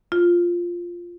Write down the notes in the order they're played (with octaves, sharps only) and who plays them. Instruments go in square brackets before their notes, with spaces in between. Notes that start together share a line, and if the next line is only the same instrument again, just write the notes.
[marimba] F4